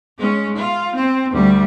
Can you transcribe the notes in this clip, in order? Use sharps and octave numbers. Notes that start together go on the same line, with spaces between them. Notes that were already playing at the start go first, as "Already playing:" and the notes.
G#3 C#4
F4
C4
D2 G3